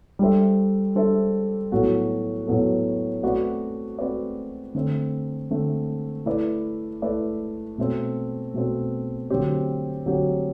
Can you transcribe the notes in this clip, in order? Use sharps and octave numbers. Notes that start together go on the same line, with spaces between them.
G3 D4 A4 C5 E5
G3 D4 A4 C5 E5
A2 F#3 B3 F#4 A4
A2 F#3 B3 F#4 A4
A3 C4 F#4 B4 D5
A3 C4 F#4 B4 D5
D3 A3 C4
D3 A3 C4
A3 E4 B4 D5
A3 E4 B4 D5
B2 A3 C4
B2 A3 C4
D3 F#3 A3 C4 G4
D3 F#3 A3 C4 G4